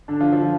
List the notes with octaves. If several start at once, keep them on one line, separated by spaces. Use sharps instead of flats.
D3 D4
F3 F4
F3 F4